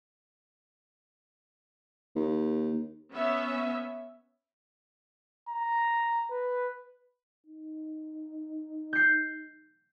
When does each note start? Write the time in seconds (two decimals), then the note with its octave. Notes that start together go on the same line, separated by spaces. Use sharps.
2.15 D#2
3.12 B3 C#4 E5
5.49 A#5
6.31 B4
7.47 D#4
8.93 G6 C7